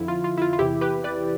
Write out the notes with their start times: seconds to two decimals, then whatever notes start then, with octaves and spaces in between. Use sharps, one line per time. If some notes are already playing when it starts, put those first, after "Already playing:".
Already playing: F2 D3 F3 E4
0.08 F4
0.24 F4
0.37 E4
0.42 F4
0.53 F4
0.59 E2 C3 E3 E4 G4
0.81 G4 B4
1.04 B4 D5